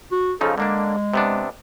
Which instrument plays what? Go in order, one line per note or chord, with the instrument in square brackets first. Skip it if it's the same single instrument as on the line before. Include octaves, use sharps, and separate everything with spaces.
[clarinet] F#4
[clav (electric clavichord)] C#3 F3 D#4 [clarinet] A4
[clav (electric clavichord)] D3 A#3 D4 [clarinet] G#3
[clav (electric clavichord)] C3 B3 D4